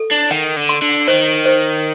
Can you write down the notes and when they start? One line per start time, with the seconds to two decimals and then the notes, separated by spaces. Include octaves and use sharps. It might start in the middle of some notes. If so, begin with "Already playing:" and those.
Already playing: A4
0.11 D4
0.30 D#3 F#5
0.56 D3
0.69 C6
0.82 D3
1.07 D#3 C5
1.45 C5